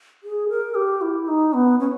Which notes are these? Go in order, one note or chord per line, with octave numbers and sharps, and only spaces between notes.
G#4
A#4
G4
E4
D#4
B3
C#4